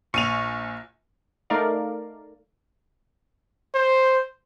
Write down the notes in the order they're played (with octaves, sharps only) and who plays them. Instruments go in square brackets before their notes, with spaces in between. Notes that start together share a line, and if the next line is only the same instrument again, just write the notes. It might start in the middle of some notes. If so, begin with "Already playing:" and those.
[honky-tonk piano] A#1 D#7 F7 [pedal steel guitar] C#6
[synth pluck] A3 D#4 A#4 D5 F5
[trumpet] C5